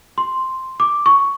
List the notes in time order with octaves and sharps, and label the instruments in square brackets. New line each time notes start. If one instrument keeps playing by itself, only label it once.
[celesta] C6
D6
C#6